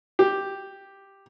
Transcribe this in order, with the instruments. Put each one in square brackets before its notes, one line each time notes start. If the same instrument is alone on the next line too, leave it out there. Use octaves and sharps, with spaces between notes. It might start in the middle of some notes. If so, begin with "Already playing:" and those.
[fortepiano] G4